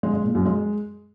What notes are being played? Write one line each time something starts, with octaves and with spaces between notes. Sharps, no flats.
G#3
G#3
A#2
F#2
G#3